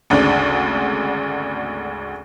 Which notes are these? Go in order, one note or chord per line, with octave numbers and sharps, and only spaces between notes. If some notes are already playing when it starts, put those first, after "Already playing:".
G#1 D2 C#3 D4